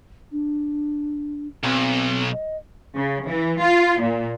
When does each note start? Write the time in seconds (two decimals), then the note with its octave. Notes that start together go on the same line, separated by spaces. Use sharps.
0.32 D4
1.64 B1 C4
2.32 D#5
2.95 C#3
3.26 E3
3.60 F4
3.99 A#2